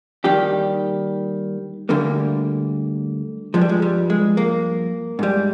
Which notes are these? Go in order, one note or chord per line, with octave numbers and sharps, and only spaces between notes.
D#2 D#3 G3 G4
D2 D3 G3 A#3
G2 F3 G#3
G3
G#3
G3
G#3
A#3
G#2 G3